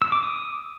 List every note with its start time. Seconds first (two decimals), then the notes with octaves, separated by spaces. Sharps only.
0.02 E6
0.12 D6
0.23 D#6